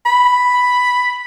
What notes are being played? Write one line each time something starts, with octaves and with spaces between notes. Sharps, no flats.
B5